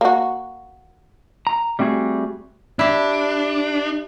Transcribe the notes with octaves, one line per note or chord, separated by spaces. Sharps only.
A#3 F#4
A#5
G3 A3 C4 F#4 G#4
D4 E4 G4